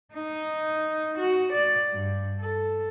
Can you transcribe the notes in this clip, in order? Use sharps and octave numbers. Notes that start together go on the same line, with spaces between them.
D#4
F#4
D5
G2
A4